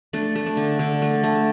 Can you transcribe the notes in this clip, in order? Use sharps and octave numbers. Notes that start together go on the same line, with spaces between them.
A3 D4
A3
D4
D3
D3
A3
A3